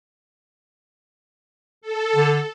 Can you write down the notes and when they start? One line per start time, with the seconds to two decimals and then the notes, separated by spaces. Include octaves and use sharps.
1.81 A4
2.16 D3